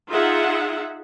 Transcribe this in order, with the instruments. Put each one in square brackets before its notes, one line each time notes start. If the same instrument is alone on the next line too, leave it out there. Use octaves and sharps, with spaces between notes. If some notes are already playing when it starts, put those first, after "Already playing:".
[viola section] D#4 F4 G#4 E5 F#5